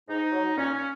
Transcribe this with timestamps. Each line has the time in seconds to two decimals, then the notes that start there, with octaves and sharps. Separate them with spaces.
0.08 G#2 D#4
0.32 F#3
0.56 A#2 C#4
0.73 C#4